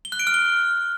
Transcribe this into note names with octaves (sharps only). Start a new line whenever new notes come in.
G7
F#6
D7
F6
G7